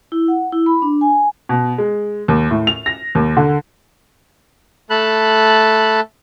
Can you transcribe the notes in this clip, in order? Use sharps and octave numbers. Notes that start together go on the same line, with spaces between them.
E4
F#5
E4
B5
D4
G#5
B2
G#3
D#2
A2
F7
A#6
D#2
D3
A3 A4 A5 B5 F#6